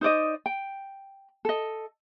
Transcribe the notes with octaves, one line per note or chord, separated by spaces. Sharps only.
D#4 C5 D5 D#5
G5
A4 D#5